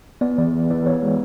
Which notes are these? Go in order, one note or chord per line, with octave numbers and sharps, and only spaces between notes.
B3 D5
E3 D5
E3
E3 D5
E3 C#5
G#3